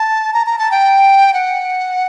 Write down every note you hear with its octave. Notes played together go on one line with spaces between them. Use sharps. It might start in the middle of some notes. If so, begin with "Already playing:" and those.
Already playing: A5
A#5
A#5
A5
G5
F#5